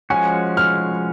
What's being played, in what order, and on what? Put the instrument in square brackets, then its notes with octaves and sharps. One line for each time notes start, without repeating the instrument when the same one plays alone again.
[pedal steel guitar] F3 G#3 C#4 F#4 [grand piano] G#5
[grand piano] F6